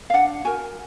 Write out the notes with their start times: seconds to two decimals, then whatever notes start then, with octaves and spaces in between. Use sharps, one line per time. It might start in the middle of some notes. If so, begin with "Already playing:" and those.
0.10 F5
0.14 D4 F#5
0.45 F#4 A#4 G#5